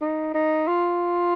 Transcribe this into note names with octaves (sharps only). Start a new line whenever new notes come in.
D#4
D#4
F4